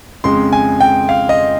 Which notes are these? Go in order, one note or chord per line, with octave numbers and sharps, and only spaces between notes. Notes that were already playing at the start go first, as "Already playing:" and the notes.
F2 C#3 G#3 C6
G#5
G5
F5
D#5